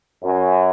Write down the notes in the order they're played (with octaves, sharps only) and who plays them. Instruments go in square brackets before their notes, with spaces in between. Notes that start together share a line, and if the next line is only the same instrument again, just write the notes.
[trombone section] F#2